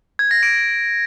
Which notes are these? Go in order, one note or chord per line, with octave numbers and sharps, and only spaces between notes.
G#6
A#6
D7